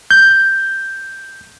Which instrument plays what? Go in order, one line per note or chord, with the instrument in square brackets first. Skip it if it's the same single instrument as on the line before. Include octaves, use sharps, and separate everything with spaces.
[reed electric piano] G6